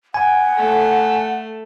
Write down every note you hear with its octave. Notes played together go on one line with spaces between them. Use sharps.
F#5 G#5
A3